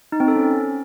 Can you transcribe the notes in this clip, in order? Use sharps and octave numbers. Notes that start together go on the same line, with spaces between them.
D#4
C4
A4
C#4